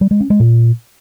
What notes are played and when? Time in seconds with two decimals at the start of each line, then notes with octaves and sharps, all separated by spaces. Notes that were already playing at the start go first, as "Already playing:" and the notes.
0.01 G3
0.11 G#3
0.20 C#4
0.30 G#3
0.40 A#2